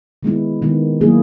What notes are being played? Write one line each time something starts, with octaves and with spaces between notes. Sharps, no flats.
D#3 G#3 B3 E4
D#3 G#3 B3 E4
D#3 F#3 A#3 E4 G#4